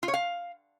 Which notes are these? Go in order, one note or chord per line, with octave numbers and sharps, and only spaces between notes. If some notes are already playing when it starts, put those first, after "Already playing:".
F4
C#5
F5